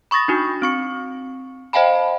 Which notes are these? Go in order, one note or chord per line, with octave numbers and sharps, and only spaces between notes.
B5 C#6 D#6 A6 A#6
D4 D#4 F#4
C4 C#6 C#7
C5 D#5 F5 G5 A5 B5